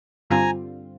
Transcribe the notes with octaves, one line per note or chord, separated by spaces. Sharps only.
G2 D3 G3 C4 F4 G#5 A#5